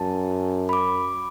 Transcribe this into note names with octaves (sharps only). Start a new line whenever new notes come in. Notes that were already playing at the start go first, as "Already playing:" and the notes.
Already playing: F#2 A5
B5
D6